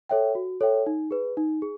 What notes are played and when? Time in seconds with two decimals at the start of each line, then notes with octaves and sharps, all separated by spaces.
0.09 A4 C#5 E5 G5
0.35 F#4
0.61 A4 C#5 E5 G5
0.86 D#4
1.11 G#4 B4
1.37 D#4
1.62 G#4